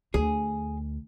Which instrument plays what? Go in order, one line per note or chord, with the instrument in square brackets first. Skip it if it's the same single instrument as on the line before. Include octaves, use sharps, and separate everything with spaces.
[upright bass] D2 [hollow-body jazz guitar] G#4